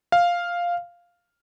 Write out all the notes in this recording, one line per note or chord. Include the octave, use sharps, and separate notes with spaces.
F5